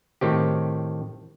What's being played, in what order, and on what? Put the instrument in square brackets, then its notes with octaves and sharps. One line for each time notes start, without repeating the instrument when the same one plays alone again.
[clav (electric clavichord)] A2 D#3 C4 G4